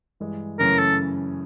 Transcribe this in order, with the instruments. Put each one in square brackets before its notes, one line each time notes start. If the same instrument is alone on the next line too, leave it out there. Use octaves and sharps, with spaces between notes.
[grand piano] G2 E3 G#3
[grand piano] F#2 C#3 E3 A3 C#4 [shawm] A#4
[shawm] A4